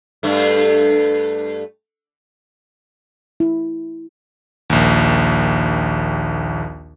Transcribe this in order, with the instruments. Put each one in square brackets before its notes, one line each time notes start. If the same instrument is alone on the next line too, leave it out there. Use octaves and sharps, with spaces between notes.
[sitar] G2 A3
[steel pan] E4
[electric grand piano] A#1 D#2